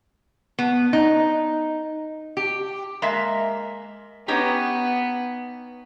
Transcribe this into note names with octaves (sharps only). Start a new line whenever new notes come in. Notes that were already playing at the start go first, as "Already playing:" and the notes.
B3
D#4
G4
G#3 A#3 E5
B3 C#4 D#4 G4